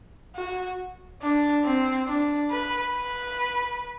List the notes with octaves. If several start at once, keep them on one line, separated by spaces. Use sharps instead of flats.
F#4
D4
C4
D4
B4
B4